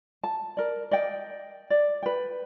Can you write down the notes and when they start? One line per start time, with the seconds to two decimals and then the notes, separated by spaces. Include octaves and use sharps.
0.23 A5
0.57 A#4 D5
0.91 D5 D#5 G5
1.70 D5
2.03 B4 G5